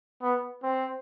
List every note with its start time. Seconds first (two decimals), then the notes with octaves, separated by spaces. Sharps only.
0.22 B3
0.63 C4